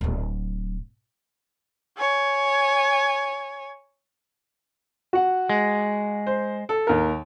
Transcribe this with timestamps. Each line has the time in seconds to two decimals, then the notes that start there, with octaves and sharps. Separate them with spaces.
0.01 D1 F#3
1.98 C#5 G#5
5.13 F#4 F#5
5.49 G#3
6.27 C5
6.69 A4
6.87 D#2 A#4